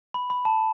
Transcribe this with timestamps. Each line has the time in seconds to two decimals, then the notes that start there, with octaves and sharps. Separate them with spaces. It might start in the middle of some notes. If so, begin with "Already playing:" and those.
0.14 B5
0.30 B5
0.45 A5